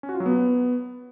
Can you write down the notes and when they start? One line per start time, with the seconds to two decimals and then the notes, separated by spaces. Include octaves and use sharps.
0.03 C#4
0.09 F#4
0.14 F4
0.20 F#3
0.26 B3